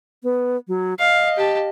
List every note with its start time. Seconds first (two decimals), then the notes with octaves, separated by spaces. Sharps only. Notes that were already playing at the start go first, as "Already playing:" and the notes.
0.24 B3
0.68 F#3
0.99 D#5 F5
1.37 G4 A5